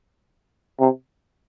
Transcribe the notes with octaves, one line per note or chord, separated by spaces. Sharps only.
C3